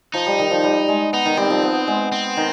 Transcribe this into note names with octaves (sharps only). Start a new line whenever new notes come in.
F3 D#4
G3
D#3
F3
G3
G#3
B3 D#4
D#3
G3 C4
F3
B3
G#3
C4
D#3